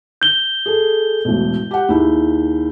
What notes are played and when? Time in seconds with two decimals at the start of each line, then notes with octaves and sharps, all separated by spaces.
0.22 G6 G7
0.66 G#4 A4
1.25 E1 A1 B2
1.71 G4 F#5
1.89 D#2 E4 G#4